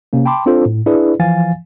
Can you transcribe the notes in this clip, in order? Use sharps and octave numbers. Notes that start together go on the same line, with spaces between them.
C3 A#3 C#4
G5 A5 B5 C6 D6
C4 D4 F4 A4 C5
A2
D4 E4 G#4 B4 D5
E3 F3 F5 G#5 A6